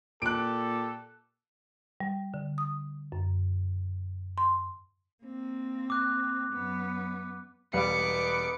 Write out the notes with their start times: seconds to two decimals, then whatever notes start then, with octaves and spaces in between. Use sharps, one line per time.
0.22 A#2 G4 A4 F#6 D7
2.00 G3
2.34 D3
2.58 D#6
3.12 F#2
4.38 C6
5.24 A#3 C4
5.90 D6 F#6
6.53 F#2 B3
7.73 E1 G3 B3 D#4 B4 F5 D6 C#7